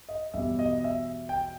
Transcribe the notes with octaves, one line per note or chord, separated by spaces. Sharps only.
D#5
E2 B2 G3 E5
D#5
E5
G5